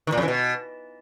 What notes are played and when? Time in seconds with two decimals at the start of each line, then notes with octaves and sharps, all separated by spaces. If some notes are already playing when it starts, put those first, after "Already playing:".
0.07 D#3
0.12 A#2
0.18 F2
0.23 E3
0.28 B2